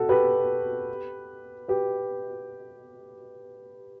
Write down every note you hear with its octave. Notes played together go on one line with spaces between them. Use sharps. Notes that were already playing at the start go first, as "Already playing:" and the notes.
Already playing: F#4 A4
G4 B4
G4 B4